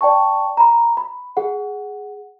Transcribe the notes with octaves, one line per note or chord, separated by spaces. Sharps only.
D5 G5 A5 C#6
A#5 B5
B5
G#4 F#5